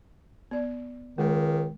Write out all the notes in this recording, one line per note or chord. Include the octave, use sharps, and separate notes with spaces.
B3 D5
C#2 D#3 G#3